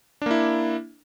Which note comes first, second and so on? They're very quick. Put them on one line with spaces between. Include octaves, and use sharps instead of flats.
D4 A#3 E4